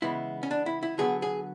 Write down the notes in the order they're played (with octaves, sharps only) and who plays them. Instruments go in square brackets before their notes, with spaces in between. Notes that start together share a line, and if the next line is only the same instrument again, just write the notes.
[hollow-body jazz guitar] C#3 E3 G#3 B3 E4
C#4
D4
E4
E4
D3 F#3 B3 G#4
G#4